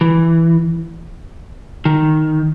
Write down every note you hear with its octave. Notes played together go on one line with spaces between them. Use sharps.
E3
D#3